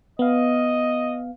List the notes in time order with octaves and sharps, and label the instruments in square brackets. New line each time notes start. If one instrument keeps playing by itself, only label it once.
[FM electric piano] B3 F5 [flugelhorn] D#5